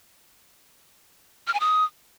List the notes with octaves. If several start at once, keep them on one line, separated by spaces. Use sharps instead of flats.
F6
G#5
D#6